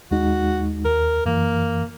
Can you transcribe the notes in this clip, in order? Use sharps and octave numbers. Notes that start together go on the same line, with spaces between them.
D#2 G#3 D#4 F#4
D#2 A#4
F#2 E3 A#3